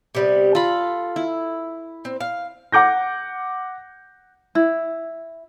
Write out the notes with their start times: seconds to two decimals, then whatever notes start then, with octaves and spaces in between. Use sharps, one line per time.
0.15 C3 G3 B3
0.55 F4 A4 B5
1.16 E4
2.05 C4
2.21 F5
2.72 F#5 D6 G6 A#6
4.55 E4